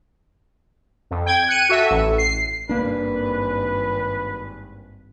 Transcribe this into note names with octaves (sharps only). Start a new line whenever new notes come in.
F2
G5 G#6
F#6 C#7 D#7
F#4 A4 E5
A1
C7
G#1 G2 A#3 D4 B4